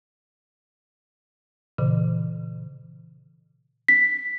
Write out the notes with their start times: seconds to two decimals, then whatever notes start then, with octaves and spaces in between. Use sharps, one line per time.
1.78 A#2 C#3 E3
3.88 B6